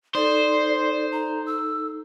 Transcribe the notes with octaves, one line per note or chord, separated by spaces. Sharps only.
D#4 A4 C5 D5
A#5
E6